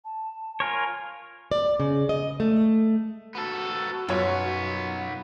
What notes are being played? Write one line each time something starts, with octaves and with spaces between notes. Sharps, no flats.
A5
F4 A#4 C#5 G#5
D5
C#3
D#5
A3
B3 F#4 A4
B1 F#2 B3 F4 C#5